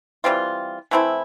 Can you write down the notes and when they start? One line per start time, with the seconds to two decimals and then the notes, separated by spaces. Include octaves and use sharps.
0.24 E3 G3 C4 F4
0.91 E3 A3 C4 E4